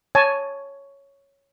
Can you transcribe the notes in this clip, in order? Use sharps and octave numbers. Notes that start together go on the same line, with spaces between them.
C#5 G#5 A5